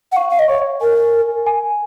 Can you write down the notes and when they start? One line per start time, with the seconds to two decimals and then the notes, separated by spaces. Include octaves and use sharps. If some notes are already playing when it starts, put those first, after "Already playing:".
0.12 F#5
0.16 F5 C#6
0.29 F5
0.39 D#5
0.48 C#5 C#6
0.81 A#4 G#5
1.13 G#5
1.47 G#5